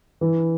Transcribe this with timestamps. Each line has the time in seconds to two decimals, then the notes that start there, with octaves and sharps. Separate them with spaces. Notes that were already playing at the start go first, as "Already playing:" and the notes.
0.21 E3